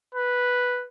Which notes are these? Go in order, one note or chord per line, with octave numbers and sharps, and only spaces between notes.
B4